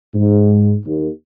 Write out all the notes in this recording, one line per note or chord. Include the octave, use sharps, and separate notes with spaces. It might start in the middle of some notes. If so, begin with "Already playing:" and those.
G#2
D#2